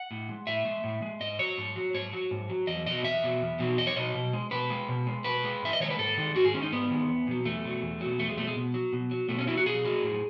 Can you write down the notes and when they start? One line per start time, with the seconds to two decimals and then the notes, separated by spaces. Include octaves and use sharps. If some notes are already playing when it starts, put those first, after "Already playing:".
Already playing: F#5
0.11 A2
0.29 G#3
0.47 A2 E5
0.65 G#3
0.84 A2
1.02 G#3
1.20 G#2 D#5
1.39 F#3 C#5
1.58 G#2
1.76 F#3
1.94 G#2 C#5
2.13 F#3
2.31 G#2
2.49 F#3
2.67 E2 D#5
2.86 B2 F#3 D#5
3.04 E2 E5
3.23 B2 F#3
3.41 E2
3.59 B2 F#3
3.78 E2 D#5
3.87 C#5
3.96 B2 F#3 D#5
4.15 B2
4.33 G#3
4.51 B2 B4
4.70 G#3
4.88 B2
5.06 G#3
5.24 B2 B4
5.44 G#3
5.62 G#2 E5
5.73 D#5
5.80 D#3 G#3 C#5
5.90 B4
5.99 G#2 A4
6.17 D#3 G#3
6.36 G#2 F#4
6.45 G#4
6.54 D#3 G#3 C#4
6.63 D#4
6.72 G#2 B3
6.90 D#3 G#3
7.09 E2
7.27 B2 F#3
7.45 E2 A3
7.65 B2 F#3
7.82 E2
8.01 B2 F#3
8.19 E2 A3
8.29 G#3
8.37 B2 F#3 A3
8.47 G#3
8.56 B2
8.74 F#3
8.93 B2
9.11 F#3
9.29 B2 A3
9.39 C#4
9.47 F#3 E4
9.57 F#4
9.66 B2 G#4
9.85 F#3
10.03 A2